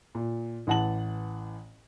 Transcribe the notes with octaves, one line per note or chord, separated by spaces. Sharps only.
A#2
A1 E3 F#5 A5 F#7